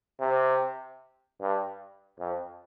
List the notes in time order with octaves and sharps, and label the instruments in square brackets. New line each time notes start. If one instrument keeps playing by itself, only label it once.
[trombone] C3
G2
F2